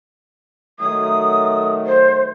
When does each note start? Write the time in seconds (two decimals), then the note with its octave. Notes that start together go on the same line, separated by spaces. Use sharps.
0.79 D#3 F#3 A3 D#6
1.86 C5